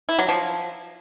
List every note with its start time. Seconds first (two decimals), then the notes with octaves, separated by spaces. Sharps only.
0.09 E4
0.19 F#3
0.29 F3